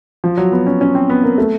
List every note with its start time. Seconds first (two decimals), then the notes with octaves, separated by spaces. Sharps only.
0.24 F3
0.37 F#3
0.52 B3
0.66 C#4
0.81 C#4
0.95 C4
1.10 B3
1.24 A#3
1.38 A3